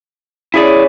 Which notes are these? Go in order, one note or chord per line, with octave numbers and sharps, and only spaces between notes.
C#4 E4 G#4 D5